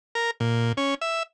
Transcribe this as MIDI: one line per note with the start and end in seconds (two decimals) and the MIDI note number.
0.15 0.31 70
0.40 0.72 46
0.77 0.95 61
1.01 1.23 76